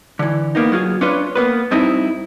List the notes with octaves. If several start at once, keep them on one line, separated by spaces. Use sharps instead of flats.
D3 E3
A#3 B3 D#4
F#3 F4 G#4
C#4 D4 F4 B4 C#5
A#3 B3 B4
G2 C4 D#4 E4